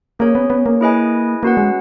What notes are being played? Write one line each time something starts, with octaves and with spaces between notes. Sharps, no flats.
A#3 C#4 G#4 C#5
B3
B3
A#3
E4 G#4 B4 D#5 G#5
A#3 C#4 F#4 B4 F#5
G#3